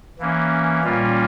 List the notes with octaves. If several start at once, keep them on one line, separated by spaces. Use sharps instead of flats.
E3 A#3 C#4
A#2 G3 A#3 C#4 F4